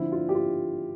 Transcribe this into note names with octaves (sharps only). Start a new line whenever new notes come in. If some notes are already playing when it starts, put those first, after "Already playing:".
Already playing: D3 F3 C4 E4
F4
G4
F4